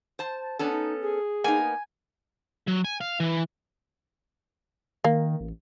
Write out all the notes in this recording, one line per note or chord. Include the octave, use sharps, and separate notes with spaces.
C5 A5
B3 C#4 D4 A4
D#4
G#4
A#3 B3 D#4 G#5
F#3
G#5
F5
E3
D#3 A#3
A1